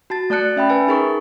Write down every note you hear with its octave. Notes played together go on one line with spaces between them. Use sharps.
F#4 A5 A6
A3 D5 A5 F#6 C#7
C#4 E5 G5 B5
B4 G#5 A5
D#4 G#4 A#4 C#6